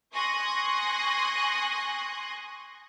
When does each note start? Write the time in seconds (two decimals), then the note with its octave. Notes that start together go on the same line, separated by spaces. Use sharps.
0.13 G#5 C6 C#6 D#6 F#6 A#6